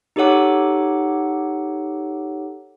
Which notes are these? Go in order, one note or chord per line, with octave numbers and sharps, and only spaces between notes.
D#4 G4 A4 C#5 F#5 D6